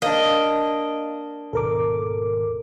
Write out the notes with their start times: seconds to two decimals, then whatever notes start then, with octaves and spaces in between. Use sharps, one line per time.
0.02 A#3 D4 D#5
1.53 G#1 D#2 B2 A4 A#4 D6